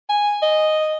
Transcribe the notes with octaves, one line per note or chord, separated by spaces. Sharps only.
G#5
D#5